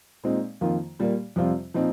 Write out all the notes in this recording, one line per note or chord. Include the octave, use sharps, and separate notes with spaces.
A#2 G#3 C4 D#4
F2 D#3 A#3 F4
A#2 G3 A#3
F2 C3 G3 C4 F4
A#2 F3 C4 D#4